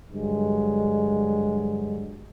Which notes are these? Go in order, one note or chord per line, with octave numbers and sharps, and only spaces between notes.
G2 D3 F#3 G#3